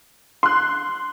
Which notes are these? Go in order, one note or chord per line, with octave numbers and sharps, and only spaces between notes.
C6 F#6